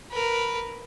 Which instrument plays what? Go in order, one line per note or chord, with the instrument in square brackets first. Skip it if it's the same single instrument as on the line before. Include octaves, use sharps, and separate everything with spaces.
[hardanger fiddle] A#4 B4